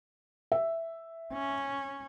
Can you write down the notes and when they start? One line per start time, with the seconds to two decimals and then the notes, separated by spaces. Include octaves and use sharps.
0.52 E5
1.32 C#4